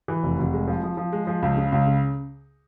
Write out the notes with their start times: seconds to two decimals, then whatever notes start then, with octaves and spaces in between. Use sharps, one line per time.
0.08 E3
0.23 F1
0.39 F1
0.53 G#3
0.68 F3
0.83 F3
0.97 F3
1.12 G#3
1.27 F3
1.42 C#2
1.57 C#3
1.72 C#2
1.86 C#3